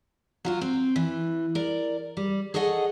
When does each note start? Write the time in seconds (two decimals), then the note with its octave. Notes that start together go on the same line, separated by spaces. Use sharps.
0.45 F#3 F4 F#4
0.61 C4
0.96 E3
1.55 A#4 D5
2.17 G3
2.54 G#4 A4 C#5 D#5 F#5